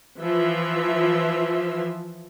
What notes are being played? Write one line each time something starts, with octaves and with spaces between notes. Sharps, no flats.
E3 F3 F4 E5